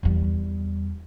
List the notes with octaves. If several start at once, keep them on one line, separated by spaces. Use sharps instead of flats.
E2 G3